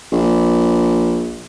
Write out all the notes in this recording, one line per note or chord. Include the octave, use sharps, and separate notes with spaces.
A#1